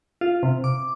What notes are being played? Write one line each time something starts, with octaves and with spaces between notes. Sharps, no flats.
F4
C3
D6